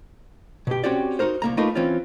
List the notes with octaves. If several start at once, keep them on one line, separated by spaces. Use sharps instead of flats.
B2 G4
C4 C#4 F#4 G4 D5
D#4 F#4 A#4 C5
C2 A#3 A#5
A3 A#3 D#4 F4 A#4 B4
E3 C4 C#4 F4